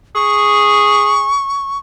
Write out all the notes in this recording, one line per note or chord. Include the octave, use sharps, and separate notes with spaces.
G#4 C#6